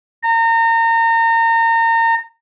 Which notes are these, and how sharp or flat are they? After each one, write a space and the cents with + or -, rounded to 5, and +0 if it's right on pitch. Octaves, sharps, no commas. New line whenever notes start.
A#5 -30